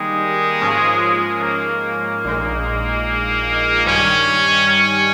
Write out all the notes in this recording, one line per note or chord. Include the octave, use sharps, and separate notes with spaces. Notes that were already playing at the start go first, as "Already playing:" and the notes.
Already playing: D#3 G3 G#3 A#3 D#4 G4
G#2 F3 A#3 C#4 F4
A#3
A#1 A#2 G#3 D#4
G2 D#3 G3 C#4
C#4